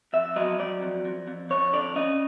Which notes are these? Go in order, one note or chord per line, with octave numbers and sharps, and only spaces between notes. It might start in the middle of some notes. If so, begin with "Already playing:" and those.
F2 E5
F#3 D#5
F#3 D5
F2
F2
F2
F2 C#5
D3 D5
C#4 D#5